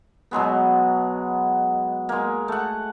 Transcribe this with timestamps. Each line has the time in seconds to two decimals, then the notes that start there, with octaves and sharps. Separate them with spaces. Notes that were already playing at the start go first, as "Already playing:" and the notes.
0.31 B2 F#3 G#3 B3
2.09 G#3 A#3
2.48 A3 F#5